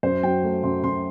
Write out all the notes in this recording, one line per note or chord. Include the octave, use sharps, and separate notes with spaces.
F#2 C5
F#3 G5
A3
F#2 C6
F#2 C6